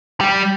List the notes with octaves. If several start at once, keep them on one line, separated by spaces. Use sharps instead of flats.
G3